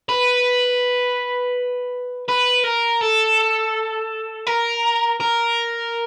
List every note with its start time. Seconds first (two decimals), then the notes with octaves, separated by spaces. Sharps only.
0.09 B4
2.28 B4
2.64 A#4
3.01 A4
4.47 A#4
5.20 A#4